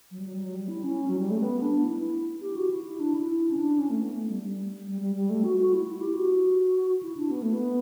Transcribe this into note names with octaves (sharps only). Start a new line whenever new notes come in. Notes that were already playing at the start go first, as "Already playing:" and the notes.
F#3
G3
F#3
G3
F#3
G3
E4
C#4
F#3
G3
A3
B3
D4
E4
G4
F#4
E4
E4
D4
E4
C#4
D4
C#4
A3
B3
A3
G3
G3
G3
G3
G3
A3
F#4
F#4
E4
E4
G4
F#4
E4
D4
B3
A3
B3